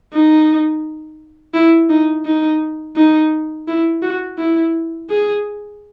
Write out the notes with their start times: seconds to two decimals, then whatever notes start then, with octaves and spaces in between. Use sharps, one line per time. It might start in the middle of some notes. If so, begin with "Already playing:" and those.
0.13 D#4
1.54 E4
1.90 D#4
2.25 D#4
2.96 D#4
3.68 E4
4.02 F#4
4.38 E4
5.10 G#4